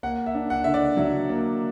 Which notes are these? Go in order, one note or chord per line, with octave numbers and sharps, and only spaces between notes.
A#3 F#5
E5
D4
F#5
D3 E5
D5
F#3 E5
A#3